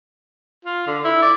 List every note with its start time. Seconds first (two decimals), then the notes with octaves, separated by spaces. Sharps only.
0.65 F4
0.87 D3
1.04 E4
1.22 D5